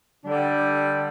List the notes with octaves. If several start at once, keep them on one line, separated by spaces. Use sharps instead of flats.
D3 G3 D4